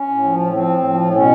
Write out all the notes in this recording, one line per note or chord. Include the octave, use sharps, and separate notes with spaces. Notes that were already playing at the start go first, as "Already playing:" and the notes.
Already playing: C#4
A2
F3
A2
F3 C4
A2
F3
A2
B2 C#4